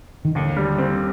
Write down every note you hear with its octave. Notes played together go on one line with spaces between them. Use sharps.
D#3
D#2 D3
G3
C4